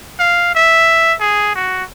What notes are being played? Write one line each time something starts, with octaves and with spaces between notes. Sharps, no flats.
F5
E5
G#4
F#4